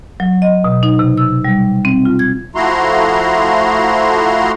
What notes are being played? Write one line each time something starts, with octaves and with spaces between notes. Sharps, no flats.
F#3
D#5
B2
D#4
C3
E6
G3
C4
F4
G#6
F3 A3 E4 F#4 A#5 C6